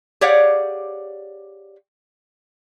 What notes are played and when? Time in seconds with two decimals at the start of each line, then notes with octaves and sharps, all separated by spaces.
0.21 G4 G#4 C#5 D5 F5 F#5